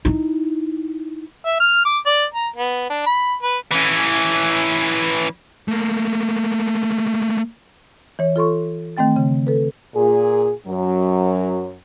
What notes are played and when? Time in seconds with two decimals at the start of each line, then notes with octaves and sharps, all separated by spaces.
0.05 D#4 E4
1.45 E5
1.60 F6
1.85 D6
2.06 D5
2.34 A#5
2.56 B3
2.90 D4
3.06 B5
3.43 B4
3.71 E3 C#4
5.68 A3 A#3
8.19 E3 C#5
8.36 F4 A4 C6 C#6
8.97 D#3 A3 C4 G5 A6
9.16 C#3
9.47 A4 B4
9.95 A#2 G#4
10.66 F#2 F#3